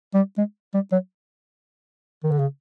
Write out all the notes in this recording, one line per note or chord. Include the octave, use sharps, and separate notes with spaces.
G3
G#3
G3
F#3
D#3
D3
C#3